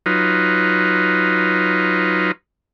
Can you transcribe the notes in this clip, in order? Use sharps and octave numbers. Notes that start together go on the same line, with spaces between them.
F#3 D#4 F4 B4